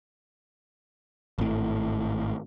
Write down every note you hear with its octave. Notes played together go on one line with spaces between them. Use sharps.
G#1 A2